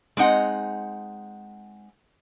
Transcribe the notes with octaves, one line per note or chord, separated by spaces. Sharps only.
G#3 C4 D#4 F#5